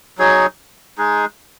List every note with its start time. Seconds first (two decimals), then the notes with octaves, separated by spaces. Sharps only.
0.18 F#3 D#4 G#4 C#5
0.98 G#3 D#4 G#4